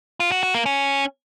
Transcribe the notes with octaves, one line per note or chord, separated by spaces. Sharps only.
F4
F#4
F#4
A#3
C#4